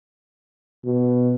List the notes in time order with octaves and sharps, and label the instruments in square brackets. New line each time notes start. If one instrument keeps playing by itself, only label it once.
[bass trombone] B2